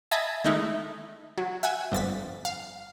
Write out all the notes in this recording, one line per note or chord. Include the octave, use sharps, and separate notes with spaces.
D#5 E5 G#5 A5 B5 D#6
D#3 G#3 A3 D#4 E4
F#3
E5 F#5 G#5
G1 F2 A6 B6
F5